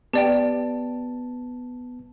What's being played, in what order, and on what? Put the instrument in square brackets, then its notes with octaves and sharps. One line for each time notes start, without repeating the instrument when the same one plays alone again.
[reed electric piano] B3 A5 [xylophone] G4 D5 G5